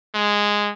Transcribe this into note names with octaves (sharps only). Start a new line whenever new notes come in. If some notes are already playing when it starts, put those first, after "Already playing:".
G#3